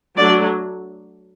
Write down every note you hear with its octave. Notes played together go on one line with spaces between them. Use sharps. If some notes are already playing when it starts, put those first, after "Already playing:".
F#3 A3 D4 D5